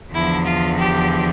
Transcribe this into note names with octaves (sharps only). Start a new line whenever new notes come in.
E2 D3 F3 E4
F4
G4